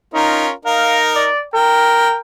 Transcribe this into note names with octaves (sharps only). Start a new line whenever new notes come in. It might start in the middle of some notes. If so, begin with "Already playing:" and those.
C#4 D#4 F4 A#4
D#4 A#4 F5
D5
A#4 G5